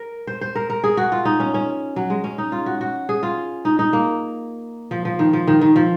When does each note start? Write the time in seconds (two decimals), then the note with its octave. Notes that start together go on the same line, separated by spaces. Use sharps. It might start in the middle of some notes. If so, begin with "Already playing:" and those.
Already playing: A#4
0.27 C5
0.41 C5
0.56 A#4
0.70 A#4
0.84 G#4
0.97 F#4
1.12 F4
1.25 D#4
1.40 C#4
1.54 C#4
1.96 F#3
2.10 G#3
2.24 C#4
2.38 D#4
2.52 F4
2.66 F#4
2.81 F#4
3.09 G#4
3.23 F4
3.65 D#4
3.79 D#4
3.93 A#3
4.91 F3
5.05 F3
5.19 D#3
5.33 F3
5.47 D#3
5.61 D#3
5.76 F3